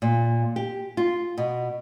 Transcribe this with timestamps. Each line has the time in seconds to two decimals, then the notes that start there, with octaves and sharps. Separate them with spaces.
0.02 A#2
0.56 G4
0.97 F4
1.38 B2